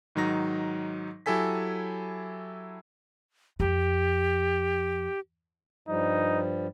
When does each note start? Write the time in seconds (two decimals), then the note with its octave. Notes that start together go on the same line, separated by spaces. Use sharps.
0.15 G#2 D#3 F#3 D#4 A#6
1.26 F#3 E4 G4 A4 G#5 B6
3.60 F2 G4
5.88 G2 F3 G3 D#4